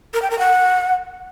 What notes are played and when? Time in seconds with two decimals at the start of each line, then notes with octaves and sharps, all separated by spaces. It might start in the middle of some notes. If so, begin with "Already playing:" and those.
0.14 A#4
0.22 G5
0.30 A#4
0.39 F#5